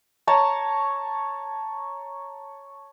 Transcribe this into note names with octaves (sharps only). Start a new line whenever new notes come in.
C#5 A5 A#5